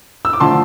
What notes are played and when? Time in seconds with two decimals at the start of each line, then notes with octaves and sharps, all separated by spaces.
0.25 E6
0.33 D6
0.40 D3 F3 A3 A5 C6